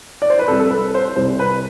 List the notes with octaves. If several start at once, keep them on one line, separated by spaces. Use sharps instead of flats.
D5
C5
B4
C2 C3 G3 A4
A4
B4
C5
C2 C3 G3 C5
B4